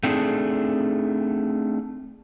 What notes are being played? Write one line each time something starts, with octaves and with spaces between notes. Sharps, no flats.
A3 C4 D4 D#4 G#4